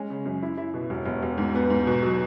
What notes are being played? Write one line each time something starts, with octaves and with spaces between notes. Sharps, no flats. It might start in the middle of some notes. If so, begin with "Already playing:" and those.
Already playing: G#3 C#4
C#3
F#2
E4
E4
B2
E1
E1
E1
G#2
B3
G#2
B2
F#3